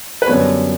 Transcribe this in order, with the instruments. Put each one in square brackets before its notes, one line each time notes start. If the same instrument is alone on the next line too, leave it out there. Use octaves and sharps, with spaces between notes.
[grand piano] B4
F#2 D3 G3 B3 C#5